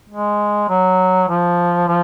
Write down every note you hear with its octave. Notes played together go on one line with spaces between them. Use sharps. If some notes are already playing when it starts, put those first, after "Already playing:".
G#3
F#3
F3
F3